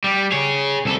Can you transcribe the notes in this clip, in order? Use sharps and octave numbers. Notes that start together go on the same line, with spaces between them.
G3
G#4 C#5
C2 A4